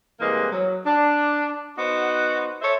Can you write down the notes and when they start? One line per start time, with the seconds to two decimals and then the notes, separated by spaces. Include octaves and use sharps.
0.20 C3 E3 G3 G#3 A#3 B4
0.51 F#3
0.85 D4
1.77 B3 D#4 F#4 C5 F#5
2.62 A4 C5 C#5 E5